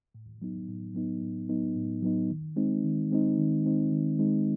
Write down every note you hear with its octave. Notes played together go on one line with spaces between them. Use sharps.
A2
F#3 B3 D#4
A2
F#3 B3 D#4
A2
F#3 B3 D#4
A2
F#3 B3 D#4
D#3
G#3 C4 D#4
D#3
G#3 C4 D#4
D#3
G#3 C4 D#4
D#3
G#3 C4 D#4